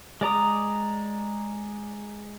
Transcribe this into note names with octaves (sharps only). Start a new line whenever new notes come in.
G#3 D5 A#5 D#6